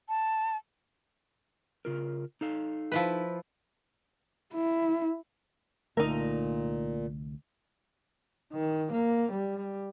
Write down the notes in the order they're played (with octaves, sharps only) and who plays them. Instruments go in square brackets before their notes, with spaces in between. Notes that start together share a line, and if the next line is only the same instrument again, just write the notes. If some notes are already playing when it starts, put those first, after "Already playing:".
[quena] A5
[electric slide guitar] C#3 F4 A#4
D#4 A4 F5
[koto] F3 E4 B4
[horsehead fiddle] E4
[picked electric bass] C2 D3 A3 [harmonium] A#2 [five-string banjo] D#4 A#4
[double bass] D#3
A#3
G3